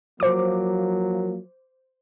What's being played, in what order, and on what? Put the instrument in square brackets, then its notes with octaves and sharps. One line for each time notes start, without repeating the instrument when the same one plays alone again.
[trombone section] F3 F#3 A#3 [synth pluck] C5 D6